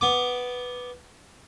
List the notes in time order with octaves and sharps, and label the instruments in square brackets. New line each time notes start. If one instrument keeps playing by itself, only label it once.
[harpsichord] B3 D6